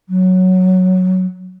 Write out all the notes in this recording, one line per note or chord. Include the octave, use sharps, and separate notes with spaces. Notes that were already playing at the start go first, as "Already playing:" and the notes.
F#3